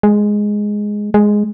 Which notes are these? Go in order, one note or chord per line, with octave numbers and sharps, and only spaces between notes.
G#3
G#3